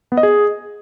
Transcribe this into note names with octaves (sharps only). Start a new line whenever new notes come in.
B3
D#5
G#4